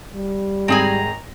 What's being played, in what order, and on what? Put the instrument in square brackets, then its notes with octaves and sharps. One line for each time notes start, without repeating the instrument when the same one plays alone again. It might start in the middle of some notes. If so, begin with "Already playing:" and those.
[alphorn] G3
[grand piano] G#1 G5 A#6 [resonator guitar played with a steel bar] C4 G#4 G#5 [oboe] A#5